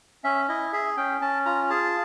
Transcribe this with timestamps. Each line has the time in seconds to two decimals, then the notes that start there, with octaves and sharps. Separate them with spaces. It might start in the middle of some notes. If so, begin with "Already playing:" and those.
0.24 C#4 E5
0.49 E4 D#5
0.73 G#4 E5
0.97 C#4 G5
1.21 C#4 A5
1.46 F4 A#5
1.70 G#4 A5